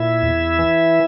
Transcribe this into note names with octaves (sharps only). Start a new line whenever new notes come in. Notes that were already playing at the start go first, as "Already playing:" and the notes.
Already playing: A#2 E4 E5
E2
E3